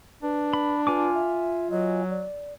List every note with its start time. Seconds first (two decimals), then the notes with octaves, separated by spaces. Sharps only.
0.23 D4 B4
0.54 B5
0.87 F4 B4 G#5 D6
1.14 E5
1.71 F#3 D#5
2.10 D5